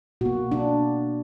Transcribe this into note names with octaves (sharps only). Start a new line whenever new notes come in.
B2 A#3 F#4
D4